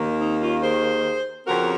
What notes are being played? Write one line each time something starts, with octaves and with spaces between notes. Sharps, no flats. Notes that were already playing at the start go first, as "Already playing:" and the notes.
Already playing: D#2 D#3 A#3
C4 D#4
C#4 F4
G#4 C5
F2 C#3 F3 C4 F#4 A#4